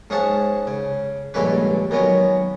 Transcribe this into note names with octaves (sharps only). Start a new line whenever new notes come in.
G#2 C#4 G#4 F5 F#5 A5
C#3
A#1 G2 D3 G#3 C#4 B4
D#3 F#3 B3 C#4